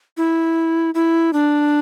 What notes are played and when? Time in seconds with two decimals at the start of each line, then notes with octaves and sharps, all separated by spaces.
0.17 E4
0.94 E4
1.33 D4